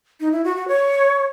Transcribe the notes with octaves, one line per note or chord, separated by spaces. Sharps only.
D#4
E4
F#4
F#4
C#5